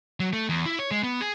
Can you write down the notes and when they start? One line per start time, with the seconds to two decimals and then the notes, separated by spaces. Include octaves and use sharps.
0.20 F#3
0.33 A3
0.49 E2
0.66 E4
0.79 C#5
0.91 G#3
1.03 B3
1.21 G#4